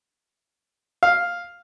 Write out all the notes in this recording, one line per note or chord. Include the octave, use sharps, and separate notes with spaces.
F5